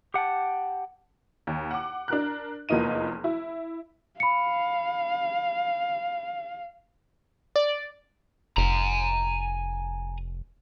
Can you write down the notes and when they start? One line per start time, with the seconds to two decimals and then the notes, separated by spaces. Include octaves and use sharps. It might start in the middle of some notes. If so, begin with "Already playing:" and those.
0.14 G4 F#5 G5 A5
1.47 D#2
1.71 F#5 D6
2.08 D4 A#4 F#6
2.69 F1 E2 F3 A#3 D#4 D#7
3.24 E4
4.20 F5 B5 C#7
7.56 D5
8.57 F1 G#5 A#5